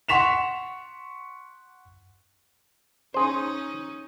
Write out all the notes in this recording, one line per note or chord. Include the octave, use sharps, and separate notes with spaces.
F#5 C6 C#6 B6 E7 F7
C#4 D#4 G#4 C5